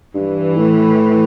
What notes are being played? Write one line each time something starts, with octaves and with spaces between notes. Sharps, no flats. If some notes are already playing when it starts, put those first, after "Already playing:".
G2 E3
A2